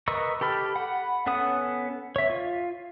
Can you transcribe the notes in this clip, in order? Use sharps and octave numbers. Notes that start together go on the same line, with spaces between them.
A#4 B4 D#5 C#6 E6
G4 A4 B5 F6
F#5 B5
B3 C#4 A4 F#5 D#6
C#5 E5
F4